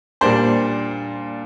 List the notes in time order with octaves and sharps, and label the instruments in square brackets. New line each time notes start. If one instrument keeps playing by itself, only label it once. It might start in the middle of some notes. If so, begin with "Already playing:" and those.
[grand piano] A#2 G3 A#3 D4 C5